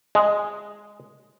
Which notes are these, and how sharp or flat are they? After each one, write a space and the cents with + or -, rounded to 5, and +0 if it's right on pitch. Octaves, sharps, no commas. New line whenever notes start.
G#3 -5